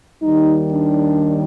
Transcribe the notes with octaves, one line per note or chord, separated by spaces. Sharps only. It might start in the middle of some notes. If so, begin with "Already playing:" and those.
D#2 D#3 G3 D#4
D4